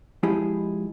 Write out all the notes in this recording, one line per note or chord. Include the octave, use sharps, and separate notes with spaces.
F3 G#3 E4 G4 G#4